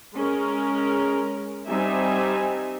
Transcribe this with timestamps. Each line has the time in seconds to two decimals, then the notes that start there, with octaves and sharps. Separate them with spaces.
0.16 G#3 C#4 A#4
1.67 G3 C4 D#4 E5 G#5